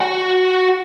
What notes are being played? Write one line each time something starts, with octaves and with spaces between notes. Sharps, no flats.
F#4 F#5